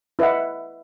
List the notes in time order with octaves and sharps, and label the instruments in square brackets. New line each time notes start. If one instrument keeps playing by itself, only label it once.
[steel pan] E4 B4 D#5 E5 F#5